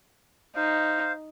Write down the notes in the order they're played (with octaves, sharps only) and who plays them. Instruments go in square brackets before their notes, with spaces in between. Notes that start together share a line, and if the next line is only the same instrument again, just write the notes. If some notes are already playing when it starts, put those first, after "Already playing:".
[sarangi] D#4 [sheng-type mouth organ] C5 F5